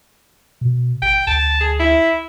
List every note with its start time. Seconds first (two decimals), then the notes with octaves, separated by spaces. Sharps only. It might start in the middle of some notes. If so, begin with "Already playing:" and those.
0.61 B2
1.02 G#1 G5
1.27 D2 A5
1.61 G#4
1.80 E4